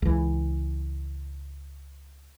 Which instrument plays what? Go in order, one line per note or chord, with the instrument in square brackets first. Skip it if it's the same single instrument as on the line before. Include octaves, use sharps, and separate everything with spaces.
[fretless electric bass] C#2 E3